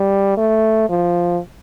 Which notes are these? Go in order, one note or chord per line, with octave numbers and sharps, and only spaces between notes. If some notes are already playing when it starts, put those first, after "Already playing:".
Already playing: G3
A3
F3